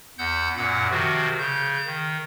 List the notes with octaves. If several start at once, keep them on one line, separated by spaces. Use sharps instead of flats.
E2 F#5 E6 G6
F#2 A#2 F#5
C3 D#3 F3 F#4
C#3 G6
D#3